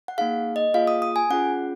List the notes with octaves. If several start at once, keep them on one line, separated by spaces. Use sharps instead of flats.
F#5
A#3 D#4 G#4 F5
D#5
A#3 F4 G#4 F5
D#6
D#6
G#5
C#4 F4 G#4 F#5